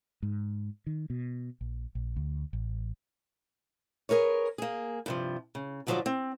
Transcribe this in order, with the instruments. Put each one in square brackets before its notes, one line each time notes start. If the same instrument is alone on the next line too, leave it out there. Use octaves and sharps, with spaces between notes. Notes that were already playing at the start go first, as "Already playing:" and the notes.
[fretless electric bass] G#2
D#3
B2
A#1
A#1
D2
A1
[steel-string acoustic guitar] G#4 A#4 B4 C#5
A#3 G#4
G2 C3 F3
C#3
G#2 D3 F3 F#3 D5 D#5
C4